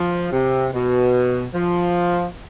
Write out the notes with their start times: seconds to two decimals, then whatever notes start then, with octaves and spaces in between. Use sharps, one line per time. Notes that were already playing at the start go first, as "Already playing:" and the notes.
Already playing: F3
0.32 C3
0.73 B2
1.53 F3